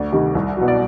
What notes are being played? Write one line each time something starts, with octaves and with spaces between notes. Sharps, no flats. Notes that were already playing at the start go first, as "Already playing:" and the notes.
Already playing: D2 D5
C3 D#3 G3
C2
B2 F#3
D5